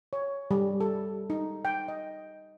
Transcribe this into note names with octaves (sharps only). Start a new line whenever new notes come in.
C#5
G3
A4
D#4
G5
D#5